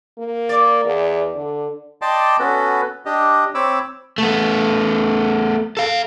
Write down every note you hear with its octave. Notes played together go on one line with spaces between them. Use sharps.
A#3
D5
E2
D3
D5 D#5 G5 A5 C6 D6
B3 C#4 F#4 A4 B4
D4 G4 D#5
C4 C#5 B5 D6 E6
A3 B3
A4 F5